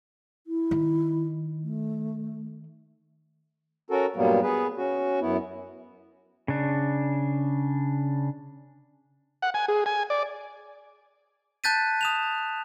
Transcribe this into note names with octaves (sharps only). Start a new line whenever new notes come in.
E4
D#3
A3
C#4 F#4 A4 A#4
G2 A#2 F#3 G3 A#3 B3
B3 G#4 B4
C#4 F#4
F#2 B3 E4
C#3 D4
F#5
G#5
G#4
G#5
D5
A5 F#6 G6 A6 B6 D#7
D#6 E7 F7